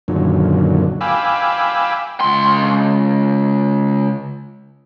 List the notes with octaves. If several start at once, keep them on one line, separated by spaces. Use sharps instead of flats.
F#2 A#2 D3 D#3 F#3
F5 G5 G#5 B5 D6 E6
C#2 C6